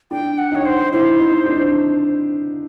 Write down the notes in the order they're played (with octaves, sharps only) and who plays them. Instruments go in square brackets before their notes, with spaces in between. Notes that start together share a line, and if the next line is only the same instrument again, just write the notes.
[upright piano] D4 [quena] G5
[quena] F#5
[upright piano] D#4 [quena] C#5
[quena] C5
[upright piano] E4 [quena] C5
[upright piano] D#4
D4